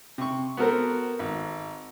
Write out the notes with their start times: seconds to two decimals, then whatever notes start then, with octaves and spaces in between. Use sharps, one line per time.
0.18 C3 C#6
0.57 B3 F#4 A4 A#4 C5
1.19 G#1